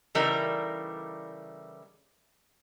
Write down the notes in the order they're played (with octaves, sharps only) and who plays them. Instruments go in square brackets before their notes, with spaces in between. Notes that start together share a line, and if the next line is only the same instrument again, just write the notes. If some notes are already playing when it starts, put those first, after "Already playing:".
[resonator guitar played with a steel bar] C#3 E3 G3 A3 D#4 A#4